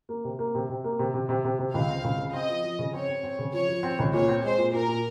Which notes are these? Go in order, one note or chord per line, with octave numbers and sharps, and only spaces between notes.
A#3
C3
A#3
C3
C3
A#3
C3
C3
C3
C3
C3
C#2 F5
C4
C#2
C#3
C4 D#5
F3
F3
C#3
C4 C#5
C4
C4
C#3
F3 C#5
F3
C4
C#2
A#2 C#5
C4
G#3 C5
A#2
A#2 A#4
A#2